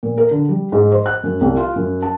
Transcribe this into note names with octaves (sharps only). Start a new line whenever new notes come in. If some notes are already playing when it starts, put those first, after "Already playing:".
A#2
A#4
D3
G3
G#2
C5
F#6
F#2
C2
F4
F#2
A5